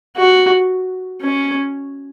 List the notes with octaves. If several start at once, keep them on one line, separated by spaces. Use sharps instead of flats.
F#4
C#4